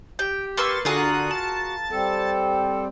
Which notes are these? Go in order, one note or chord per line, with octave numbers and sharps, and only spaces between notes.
G4 G5
A#3 B4 C6 C#6 E6 A6
D3 F4 F#4 G#4 A#4 D#6 F#6
A5
G3 C4 A4